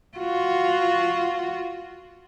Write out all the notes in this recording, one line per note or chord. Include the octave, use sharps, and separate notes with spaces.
F4 F#4